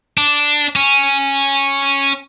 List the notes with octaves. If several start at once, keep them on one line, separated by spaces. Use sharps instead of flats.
D4
C#4